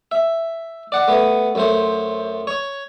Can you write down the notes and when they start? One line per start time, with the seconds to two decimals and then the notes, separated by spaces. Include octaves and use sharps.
0.12 E5
0.92 D5 F#5
1.08 A3 B3
1.55 F#2 A3 C5
2.47 C#5